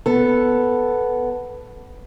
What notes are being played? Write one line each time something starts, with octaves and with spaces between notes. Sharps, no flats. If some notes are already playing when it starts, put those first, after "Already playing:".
B3 A4